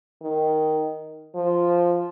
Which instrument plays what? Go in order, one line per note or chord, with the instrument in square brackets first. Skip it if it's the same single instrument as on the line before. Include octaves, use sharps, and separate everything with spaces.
[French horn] D#3
F3